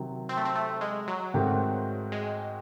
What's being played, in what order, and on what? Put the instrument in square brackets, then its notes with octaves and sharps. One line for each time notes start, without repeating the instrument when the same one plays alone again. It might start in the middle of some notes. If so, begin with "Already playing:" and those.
Already playing: [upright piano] C3 D#3 F#3
[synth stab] C4
A3
C4
A3
G#3
F#3
[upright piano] G#2 D#3 A3 C4 F#4
[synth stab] G#3